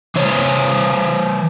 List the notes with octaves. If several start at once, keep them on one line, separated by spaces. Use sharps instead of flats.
E3 C5 C#5